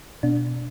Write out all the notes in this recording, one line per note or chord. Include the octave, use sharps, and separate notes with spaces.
B2 D4